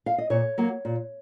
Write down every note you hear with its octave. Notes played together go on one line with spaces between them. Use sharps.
F5
D#5
A#2 C#5
F#3 A#3
A#2